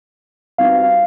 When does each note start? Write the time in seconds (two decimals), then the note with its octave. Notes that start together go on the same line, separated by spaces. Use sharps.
0.58 G3 C4 D#4 F#4 B4 F5
0.78 F5